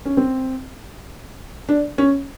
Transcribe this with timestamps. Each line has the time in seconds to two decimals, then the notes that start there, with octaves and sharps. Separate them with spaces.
0.05 C#4
0.17 C4
1.69 D4
1.98 C#4